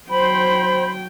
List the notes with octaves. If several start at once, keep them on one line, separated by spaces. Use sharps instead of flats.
F#3 C5 G5 B5